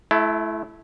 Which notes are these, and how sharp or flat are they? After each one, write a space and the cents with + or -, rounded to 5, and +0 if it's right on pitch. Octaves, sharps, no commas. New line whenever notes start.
A3 -30 E4 +15